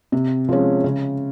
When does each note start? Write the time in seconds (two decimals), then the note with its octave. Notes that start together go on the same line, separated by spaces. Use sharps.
0.12 C3
0.49 F3 G#3 C#4
0.84 C#3